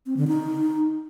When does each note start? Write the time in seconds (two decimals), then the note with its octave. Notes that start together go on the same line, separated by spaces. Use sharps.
0.06 C4
0.17 D3
0.28 D#4